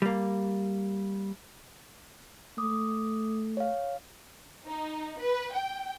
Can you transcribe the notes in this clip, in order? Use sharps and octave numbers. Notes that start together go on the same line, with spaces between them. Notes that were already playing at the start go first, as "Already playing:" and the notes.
G3 A#3
A3 D6 D#6
C#5 F5
D#4
B4
G5